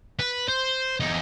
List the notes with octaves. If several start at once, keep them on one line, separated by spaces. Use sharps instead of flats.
B4
C5
E2 D#4